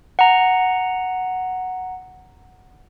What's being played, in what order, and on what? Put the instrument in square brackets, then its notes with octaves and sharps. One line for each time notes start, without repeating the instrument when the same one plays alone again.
[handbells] F#5 A#5